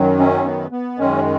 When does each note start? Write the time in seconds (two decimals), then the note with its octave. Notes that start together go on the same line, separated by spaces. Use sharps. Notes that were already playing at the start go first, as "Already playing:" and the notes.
Already playing: F#2 D#3 F#3
0.20 C#4
0.45 B3
0.72 B3
0.98 F#2 D#3 G#3 C#4